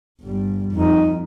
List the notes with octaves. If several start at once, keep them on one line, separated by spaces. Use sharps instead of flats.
G1 G3
F2 D#4